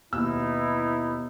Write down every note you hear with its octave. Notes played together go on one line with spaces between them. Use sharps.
D#2 B2 B3 D#4 E4 E6